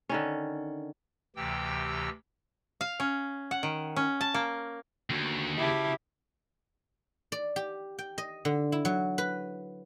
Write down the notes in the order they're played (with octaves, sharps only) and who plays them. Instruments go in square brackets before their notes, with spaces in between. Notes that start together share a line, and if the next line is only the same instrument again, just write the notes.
[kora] D3 D#3 C#4
[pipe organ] D2 C3 E3 G4 G5 E6
[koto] F5
C#4
F#5
D#3
C#4
A5
A#3
[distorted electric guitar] D#2 [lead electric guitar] D3 F#4
[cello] C#3 G4 [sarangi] E4 [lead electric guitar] F#4 A5
[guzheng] D5
G4
G5
D#5
D3
E4
F#3
B4